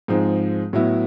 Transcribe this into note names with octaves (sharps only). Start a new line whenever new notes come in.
G#2 F3 G#3 C4 D#4
A2 F#3 B3 E4